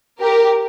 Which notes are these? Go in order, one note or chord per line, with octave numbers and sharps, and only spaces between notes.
G4 A#4